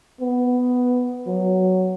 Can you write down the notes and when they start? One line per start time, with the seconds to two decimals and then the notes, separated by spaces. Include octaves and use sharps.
0.21 B3
1.27 F#3